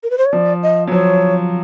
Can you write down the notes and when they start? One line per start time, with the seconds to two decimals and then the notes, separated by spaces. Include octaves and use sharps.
0.03 A#4
0.10 B4
0.18 C5
0.25 C#5
0.33 F3 D5
0.63 D#5
0.87 F#3
0.92 F3 C#5